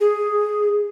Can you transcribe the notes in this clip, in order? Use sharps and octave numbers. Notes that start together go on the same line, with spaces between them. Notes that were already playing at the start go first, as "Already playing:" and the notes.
G#4